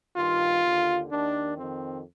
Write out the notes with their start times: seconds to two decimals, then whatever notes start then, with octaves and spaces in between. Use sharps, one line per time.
0.16 G2 D#3 F4
0.62 D#2 D3
1.10 D#2 D#3 D4
1.56 F2 D#3 C4